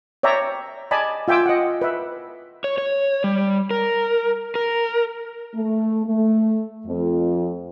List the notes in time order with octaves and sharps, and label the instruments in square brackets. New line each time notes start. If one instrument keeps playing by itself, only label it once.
[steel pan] C#5 D5 E5 G5 A#5
D5 D#5 G#5 A5 B5
F4 E5 G5 G#5 D6 E6
D#5 F#5
B4 E5
[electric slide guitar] C#5
C#5
G3
A#4
A#4
[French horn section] A3
A3
F2